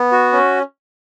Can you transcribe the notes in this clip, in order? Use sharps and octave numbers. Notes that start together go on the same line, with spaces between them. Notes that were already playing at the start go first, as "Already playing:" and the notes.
Already playing: B3
F#4
C#4